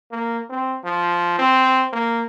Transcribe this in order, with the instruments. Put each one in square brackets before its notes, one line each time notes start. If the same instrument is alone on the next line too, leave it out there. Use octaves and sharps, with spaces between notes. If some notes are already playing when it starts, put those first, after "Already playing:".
[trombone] A#3
C4
F3
C4
A#3